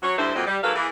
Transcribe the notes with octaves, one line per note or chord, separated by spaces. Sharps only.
F#3 C#5
D2 G2 E4 A4 C5
F2 A#2 F#3 C4 D#5
G3
G#2 F#3 A#3 A4 B4 F5
E3 A#3 G#4